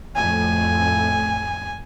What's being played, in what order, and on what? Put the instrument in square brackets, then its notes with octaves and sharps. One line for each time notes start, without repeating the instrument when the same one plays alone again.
[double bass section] F2 A2 A3 [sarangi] G#5